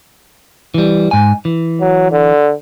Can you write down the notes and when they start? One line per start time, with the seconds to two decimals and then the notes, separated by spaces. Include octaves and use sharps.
0.74 E3 G3
1.11 G#2 G#5
1.45 E3
1.81 F#3
2.12 D3